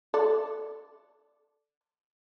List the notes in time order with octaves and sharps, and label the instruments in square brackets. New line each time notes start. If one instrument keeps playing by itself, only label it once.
[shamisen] A4 D5